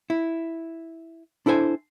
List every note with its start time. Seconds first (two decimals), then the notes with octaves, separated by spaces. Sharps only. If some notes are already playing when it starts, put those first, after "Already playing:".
0.10 E4
1.46 D4 E4 A4 C5 G#5